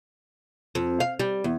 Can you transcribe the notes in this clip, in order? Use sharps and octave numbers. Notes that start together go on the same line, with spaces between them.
F2
F5
G3
E2